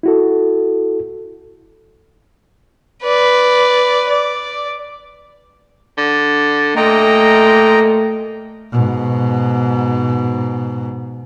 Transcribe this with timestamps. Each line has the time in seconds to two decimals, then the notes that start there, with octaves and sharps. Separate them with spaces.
0.03 E4 F#4 A4
3.03 B4 D5
4.09 D5
5.98 D3
6.76 A#2 A3 D#5 G5 A#5
8.72 G#2 B2